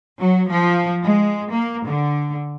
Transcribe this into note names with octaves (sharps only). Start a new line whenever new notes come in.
F#3
F3
G#3
A#3
D3